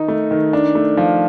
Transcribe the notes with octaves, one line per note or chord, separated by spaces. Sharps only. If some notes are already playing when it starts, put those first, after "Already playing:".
Already playing: D#3 D#4
A3
D#3
D4
A3
F3